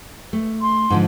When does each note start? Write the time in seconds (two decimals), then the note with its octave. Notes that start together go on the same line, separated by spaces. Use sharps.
0.33 A3
0.62 C6
0.90 G#2 D3 F3